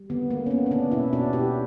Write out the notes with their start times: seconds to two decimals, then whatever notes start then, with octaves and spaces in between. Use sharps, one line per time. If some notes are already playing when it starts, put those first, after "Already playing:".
Already playing: G3
0.10 D3 B3
0.30 D3 A#3
0.46 C#4
0.51 A#3 B3
0.66 C#4
0.71 D3 B3 D4
0.92 B2 C#4 E4
1.13 B2 D4 F#4
1.33 B2 E4 G4